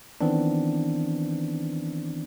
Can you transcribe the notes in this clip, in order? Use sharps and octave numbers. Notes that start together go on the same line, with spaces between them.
D#3 E3 B3 C4 D4